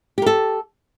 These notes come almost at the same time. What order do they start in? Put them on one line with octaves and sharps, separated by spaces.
G4 A#4 A4